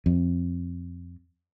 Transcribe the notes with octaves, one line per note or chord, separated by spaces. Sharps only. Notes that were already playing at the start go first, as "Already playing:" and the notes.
F2